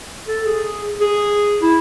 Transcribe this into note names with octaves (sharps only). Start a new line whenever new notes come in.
A4
G#4
G#4
E4